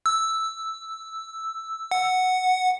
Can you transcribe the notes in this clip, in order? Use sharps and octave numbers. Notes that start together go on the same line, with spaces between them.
E6
F#5